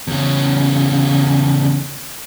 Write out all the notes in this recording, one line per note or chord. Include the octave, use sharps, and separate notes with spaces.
E2 C#3